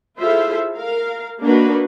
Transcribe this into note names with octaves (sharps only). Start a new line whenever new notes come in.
E4 F4 G#4 A4 C5 E5
A#4 F5
A#3 D4 D#4 F#4 B4